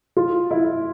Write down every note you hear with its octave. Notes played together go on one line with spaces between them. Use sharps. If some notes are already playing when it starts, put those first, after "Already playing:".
F4
E4